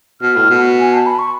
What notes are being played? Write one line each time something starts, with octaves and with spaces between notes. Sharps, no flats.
B2 F6
A2
B2
G#5
A5
B5
C#6